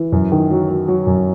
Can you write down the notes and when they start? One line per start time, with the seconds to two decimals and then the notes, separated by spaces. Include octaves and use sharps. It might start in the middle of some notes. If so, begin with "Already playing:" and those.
Already playing: E3
0.12 F#2
0.32 D#3
0.51 F#3
0.69 F#3
0.88 F#3
1.07 F#2